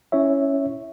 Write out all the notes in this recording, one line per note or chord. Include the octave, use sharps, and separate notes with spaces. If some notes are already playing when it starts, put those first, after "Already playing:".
C#4 E4 C#5 E5